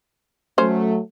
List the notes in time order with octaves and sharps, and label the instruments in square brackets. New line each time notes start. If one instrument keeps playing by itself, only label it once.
[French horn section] F#3 A3 [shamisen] C#4 C5